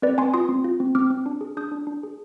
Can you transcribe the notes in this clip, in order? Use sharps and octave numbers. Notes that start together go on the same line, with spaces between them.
C4 B4 D5
C4 G#5 C6
F4 C6 D#6
C4
F4
C4
C4 D6 F6
C4
D4
G#4
D4 D#6 G6
D4
D4
G#4